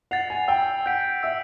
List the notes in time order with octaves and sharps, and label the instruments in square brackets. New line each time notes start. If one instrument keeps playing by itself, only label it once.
[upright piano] F#5 [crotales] A6 C7 F7
[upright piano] G#5
[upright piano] G5 [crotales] E6
[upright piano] F#5 [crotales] G6 B6 D7
[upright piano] E5 [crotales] E6